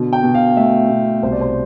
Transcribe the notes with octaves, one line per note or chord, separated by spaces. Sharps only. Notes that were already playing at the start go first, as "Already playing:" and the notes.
Already playing: B2 D3
G5
B2
F5
A3 E5
B2
C2 C5
D5
C5